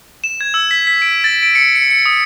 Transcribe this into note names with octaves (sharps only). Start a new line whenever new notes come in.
E7
G#6
E6
B6
B6
D7
A6
D7
C#7
C#7
C#7
D#6